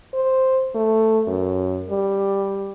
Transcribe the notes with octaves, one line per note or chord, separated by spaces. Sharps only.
C5
A3
F#2
G3